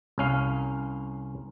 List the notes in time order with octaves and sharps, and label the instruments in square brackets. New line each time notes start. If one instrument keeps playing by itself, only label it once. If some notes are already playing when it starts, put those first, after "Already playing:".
[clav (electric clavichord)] C2 C#4 F5